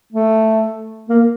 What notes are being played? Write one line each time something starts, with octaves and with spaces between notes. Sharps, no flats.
A3
A#3